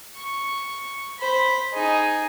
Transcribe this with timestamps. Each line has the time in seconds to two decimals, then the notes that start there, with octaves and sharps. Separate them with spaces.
0.17 C#6
1.19 C5 B5
1.74 D#4 G#4